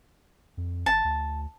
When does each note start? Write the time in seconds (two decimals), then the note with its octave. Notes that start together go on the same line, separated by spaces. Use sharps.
0.57 F2
0.86 G#1 A5
1.04 D2